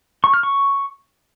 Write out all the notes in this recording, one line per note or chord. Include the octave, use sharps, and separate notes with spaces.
C#6
F6
C#6